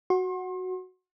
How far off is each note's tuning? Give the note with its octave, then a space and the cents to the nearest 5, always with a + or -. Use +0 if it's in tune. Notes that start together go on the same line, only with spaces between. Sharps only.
F#4 +0 C6 +40